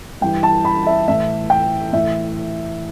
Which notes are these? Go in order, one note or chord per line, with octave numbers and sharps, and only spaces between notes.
G2 E3 G5
A5
B5
E5
A2 E3 E5
G5
A2 E3 E5